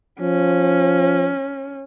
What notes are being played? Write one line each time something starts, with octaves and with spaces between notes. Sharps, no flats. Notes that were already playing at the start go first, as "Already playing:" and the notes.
F3 C#4